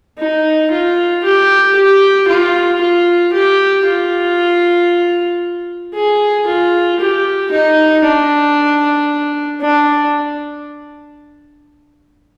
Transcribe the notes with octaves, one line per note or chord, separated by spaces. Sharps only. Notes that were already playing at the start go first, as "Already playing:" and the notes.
D#4
F4
G4
G4
F4
F4
G4
F4
G#4
F4
G4
D#4
D4
D4